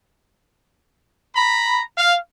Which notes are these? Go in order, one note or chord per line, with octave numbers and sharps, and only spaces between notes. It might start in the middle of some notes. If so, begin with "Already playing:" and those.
A#5 B5
F5